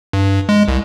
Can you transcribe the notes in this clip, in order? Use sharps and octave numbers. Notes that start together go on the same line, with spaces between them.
G2
G#3
C2